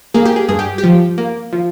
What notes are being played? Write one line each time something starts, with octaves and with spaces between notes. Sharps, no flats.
A#3 G#4
G4
G#4
G2 G#4
G4
G4
F3
A#3
F3